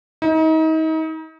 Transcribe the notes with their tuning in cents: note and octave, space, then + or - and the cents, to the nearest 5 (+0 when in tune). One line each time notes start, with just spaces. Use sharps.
D#4 +35